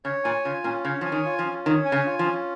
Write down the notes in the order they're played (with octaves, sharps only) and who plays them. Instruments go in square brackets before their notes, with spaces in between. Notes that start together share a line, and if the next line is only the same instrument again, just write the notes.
[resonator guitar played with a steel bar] C#3 [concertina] C#5
[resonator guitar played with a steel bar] A#2 [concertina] G#5
[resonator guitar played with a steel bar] C#3 [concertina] F4
[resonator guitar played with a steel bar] A#2 [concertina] C#4
[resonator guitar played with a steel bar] C#3 [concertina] C#5
[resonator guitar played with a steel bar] F3 [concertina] G#5
[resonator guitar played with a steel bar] D#3
[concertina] F4
[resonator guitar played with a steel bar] F3
[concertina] C#4
[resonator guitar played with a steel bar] D#3 [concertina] C#5
[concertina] G#5
[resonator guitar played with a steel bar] C#3
[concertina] F4
[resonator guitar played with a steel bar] F3
[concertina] C#4